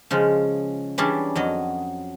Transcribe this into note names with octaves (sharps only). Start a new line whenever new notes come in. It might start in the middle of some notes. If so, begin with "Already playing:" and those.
C#3 F3 G#3
E3 G3 C#4 D4 G#4 A5
F2 F#3 D#5